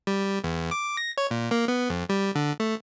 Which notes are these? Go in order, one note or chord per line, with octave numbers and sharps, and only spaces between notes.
G3
E2
D6
A#6
C#5
A#2
A#3
B3
F2
G3
D3
A3